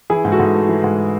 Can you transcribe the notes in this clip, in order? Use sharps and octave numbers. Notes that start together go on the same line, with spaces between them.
E3 E4 G#4
G#2
F#4 A4
G#2
A3
E3
G#2